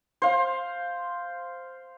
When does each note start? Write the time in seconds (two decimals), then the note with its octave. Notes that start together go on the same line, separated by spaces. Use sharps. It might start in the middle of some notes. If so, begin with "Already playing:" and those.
0.22 C5 F5